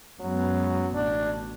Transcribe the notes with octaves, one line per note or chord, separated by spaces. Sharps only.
F#2 F#3 G#3 B3
A1 B2 D4